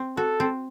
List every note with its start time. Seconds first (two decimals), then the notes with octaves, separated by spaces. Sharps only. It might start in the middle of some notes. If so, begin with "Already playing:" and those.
Already playing: C4
0.17 F#4 A4
0.40 C4